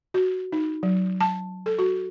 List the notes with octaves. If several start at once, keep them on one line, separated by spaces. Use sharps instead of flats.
F#4
D#4
F#3
A5
A4
F#4